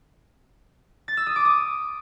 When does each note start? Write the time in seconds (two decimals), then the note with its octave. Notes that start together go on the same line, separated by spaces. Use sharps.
1.08 A6
1.17 E6
1.27 D#6
1.36 D6
1.45 D#6